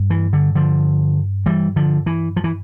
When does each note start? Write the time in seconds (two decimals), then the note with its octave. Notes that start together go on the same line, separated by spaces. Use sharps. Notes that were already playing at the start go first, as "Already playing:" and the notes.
Already playing: G2
0.10 E3
0.33 D3
0.55 D3 F3
1.46 E3 G3
1.76 D3 F3
2.06 E3
2.36 F3
2.44 E3